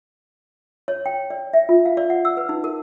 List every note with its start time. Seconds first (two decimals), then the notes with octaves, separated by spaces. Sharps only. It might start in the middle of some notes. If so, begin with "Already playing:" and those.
0.88 C#5
1.06 G5
1.30 D5
1.53 E5
1.69 F4
1.86 F5
1.97 D5
2.10 F#5
2.25 E6
2.37 B4
2.49 D#4
2.64 A#4